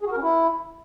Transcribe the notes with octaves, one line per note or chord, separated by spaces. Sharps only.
G#4
F#4
A#4
C#4
E4